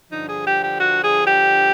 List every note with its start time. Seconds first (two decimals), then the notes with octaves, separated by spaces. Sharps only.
0.11 G2 D3 F3 D#4
0.29 G#4
0.46 G4
0.63 G4
0.80 F#4
1.04 G#4
1.27 G4